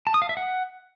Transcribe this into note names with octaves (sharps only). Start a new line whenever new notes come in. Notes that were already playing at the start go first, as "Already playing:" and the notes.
A5
D#6
F5
E5
F#5